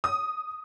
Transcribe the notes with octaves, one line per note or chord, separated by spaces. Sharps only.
D#6